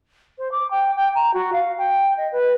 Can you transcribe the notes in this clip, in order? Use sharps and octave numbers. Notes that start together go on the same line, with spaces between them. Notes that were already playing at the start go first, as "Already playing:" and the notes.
C5
D6
G5
G5
A#5
F#4
F5
G5
D#5
B4